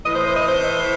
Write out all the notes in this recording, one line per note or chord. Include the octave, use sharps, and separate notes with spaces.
A2 E3 D#5
C5
C5
D#5
C5